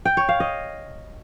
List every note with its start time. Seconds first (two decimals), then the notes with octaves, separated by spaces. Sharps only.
0.05 G5
0.17 C#5
0.29 F5
0.40 D#5